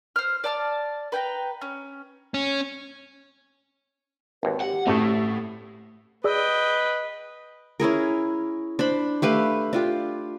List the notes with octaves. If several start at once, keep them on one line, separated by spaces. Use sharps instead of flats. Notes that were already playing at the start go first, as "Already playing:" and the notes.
C5 F6
D5 A5 F6
B4 G5 G#5 A#5
C#4
C#4
G#1 D#2 B4
G4 F#5
A1 D2 A2 A3 C#6 D#6
G#4 B4 D5 D#5 G5 E6
C#4 E4 G#4 A#4
D4 C5 B5
A3 G4 B4 F5
D4 F4 G4